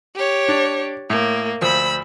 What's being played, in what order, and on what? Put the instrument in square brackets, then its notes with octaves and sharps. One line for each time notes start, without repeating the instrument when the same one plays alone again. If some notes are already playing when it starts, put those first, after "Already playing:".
[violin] G4 C#5
[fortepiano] D4
[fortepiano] A2 [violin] A#3
[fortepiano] D2 F3 [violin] B5 E6